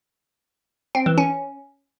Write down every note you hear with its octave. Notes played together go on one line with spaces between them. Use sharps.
C4
E3
C#4